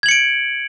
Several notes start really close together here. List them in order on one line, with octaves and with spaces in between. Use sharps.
G#6 F#7 C#7 D7